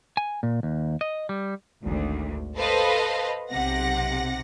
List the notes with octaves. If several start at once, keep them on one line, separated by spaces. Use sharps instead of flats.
G#5
A#2
D#2
D#5
G3
G#1 D2
A4 B4 C5 D#5 F5
B1 C3 F#5 A#6